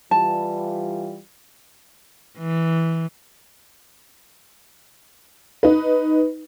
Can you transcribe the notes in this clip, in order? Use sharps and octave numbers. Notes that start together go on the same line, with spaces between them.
E3 G3 F4 A5
E3
D#4 B4